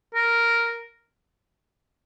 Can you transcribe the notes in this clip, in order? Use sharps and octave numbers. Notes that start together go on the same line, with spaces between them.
A#4